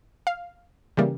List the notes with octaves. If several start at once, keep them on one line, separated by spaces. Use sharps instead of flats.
F5
C#3 E3 G3 A#3